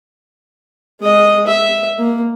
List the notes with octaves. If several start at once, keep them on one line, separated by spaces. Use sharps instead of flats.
G#3 D#5
E5
A#3